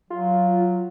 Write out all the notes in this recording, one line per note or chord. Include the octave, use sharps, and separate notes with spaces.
F#3 F4